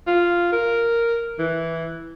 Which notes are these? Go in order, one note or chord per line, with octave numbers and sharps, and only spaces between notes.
F4
A#4
E3